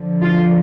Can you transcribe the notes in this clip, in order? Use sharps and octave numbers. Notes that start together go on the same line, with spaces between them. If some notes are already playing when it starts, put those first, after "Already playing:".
Already playing: D3 F3
F4